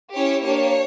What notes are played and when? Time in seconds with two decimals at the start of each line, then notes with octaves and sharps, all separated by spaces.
0.14 C#4 E4 G4 C#5
0.44 A#3 D4 G4 C#5